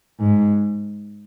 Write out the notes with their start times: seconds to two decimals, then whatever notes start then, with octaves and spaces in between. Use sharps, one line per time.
0.20 G#2